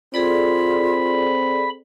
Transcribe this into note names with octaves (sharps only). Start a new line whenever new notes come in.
C4 F4 G#4 A4 D5 B5